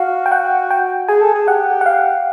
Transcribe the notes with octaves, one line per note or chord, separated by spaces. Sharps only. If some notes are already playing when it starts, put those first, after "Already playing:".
Already playing: F#4 F5
G5
F#5
G5
G#4 G#5
A4
G#4
G4 F#5
F#5
F5